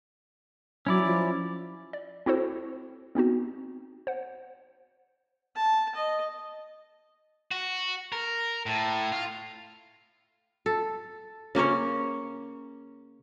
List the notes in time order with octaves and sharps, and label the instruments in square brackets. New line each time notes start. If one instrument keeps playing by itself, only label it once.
[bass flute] F#3 [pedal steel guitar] C#4 E4 D5
[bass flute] F3
[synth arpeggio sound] D5
C4 E4 F#4 A4 C5
B3 C4 D#4 F#4
C5 F#5
[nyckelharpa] A5
D#5
[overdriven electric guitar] F#4
A#4
A2
F4
[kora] A4
C#3 A#3 C#4 C#5